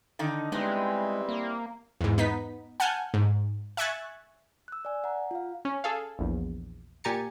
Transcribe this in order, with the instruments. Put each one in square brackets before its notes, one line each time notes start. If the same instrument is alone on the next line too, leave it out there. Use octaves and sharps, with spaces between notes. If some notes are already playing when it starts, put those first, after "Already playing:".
[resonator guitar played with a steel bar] D3 D#3 D#4
[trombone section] G3 C4 E4 [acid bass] G#3 [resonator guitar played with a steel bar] B3 D#4
[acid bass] A#3
[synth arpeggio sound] E2 G#2
B3 D#4 B6
F#5 G#5 A5 F6 G6
G#2
E5 G#5 C#6 F#6 G#6 A6
[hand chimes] E6 F#6
D5 G#5
F#5 A#5
F4 F5
[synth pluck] C#4
G#4 A4 F5
A#1 E2
A#2 G4 G#5 A#5 A6 C#7